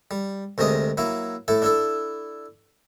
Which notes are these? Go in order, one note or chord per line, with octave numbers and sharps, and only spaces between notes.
G3
D2 C3 G#3 A#4 D#5 D#6
F#3 A#3 E4
A2 E4 A4
D4 E4 A4